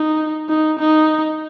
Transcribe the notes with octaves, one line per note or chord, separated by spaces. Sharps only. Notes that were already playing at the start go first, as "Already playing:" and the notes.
Already playing: D#4
D#4
D#4